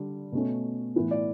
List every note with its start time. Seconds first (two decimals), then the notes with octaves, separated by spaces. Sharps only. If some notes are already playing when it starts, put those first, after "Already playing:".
Already playing: D3 G3
0.32 B2 A3 C#4
0.96 A2 E3 B3
1.11 D5